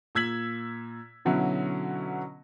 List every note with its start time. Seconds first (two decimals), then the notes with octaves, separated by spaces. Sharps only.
0.15 A#2 E6 G#6 B6 F#7
1.25 B2 D3 F#3 C#4 E4 F#4